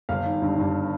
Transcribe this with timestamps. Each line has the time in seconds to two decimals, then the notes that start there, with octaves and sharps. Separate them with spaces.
0.09 G1 F5
0.25 D#3
0.42 G2
0.58 G2